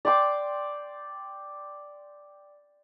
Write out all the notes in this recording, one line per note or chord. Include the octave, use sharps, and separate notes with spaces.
D5 G5 C6 D6